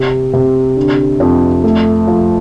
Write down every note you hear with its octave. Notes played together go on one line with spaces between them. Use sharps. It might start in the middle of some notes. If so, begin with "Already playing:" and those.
Already playing: C3 C4
C3
D3
F2
A3
F3